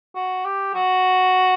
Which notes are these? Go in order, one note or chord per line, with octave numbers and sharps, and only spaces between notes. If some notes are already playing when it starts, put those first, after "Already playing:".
F#4
G4
F#4